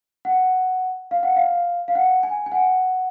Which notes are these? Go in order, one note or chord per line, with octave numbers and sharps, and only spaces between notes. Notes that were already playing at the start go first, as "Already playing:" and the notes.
F#5
F5
F#5
F5
F5
F#5
G#5
G#5
F#5